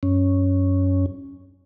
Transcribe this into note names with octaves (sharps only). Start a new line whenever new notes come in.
F#2 C#4